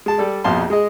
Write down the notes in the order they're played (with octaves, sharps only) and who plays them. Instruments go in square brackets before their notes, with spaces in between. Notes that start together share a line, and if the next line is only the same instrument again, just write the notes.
[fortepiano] G#3 A5
G3 A4 D5
A#1 F2 B2 F5 A5 C6
G#3 G#4 D#5